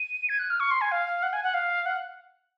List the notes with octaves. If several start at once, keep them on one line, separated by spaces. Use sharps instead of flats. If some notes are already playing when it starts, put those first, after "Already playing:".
Already playing: D#7
G#6
F#6
F6
C#6
C6
G#5
F5
F#5
G#5
F#5
F5
F#5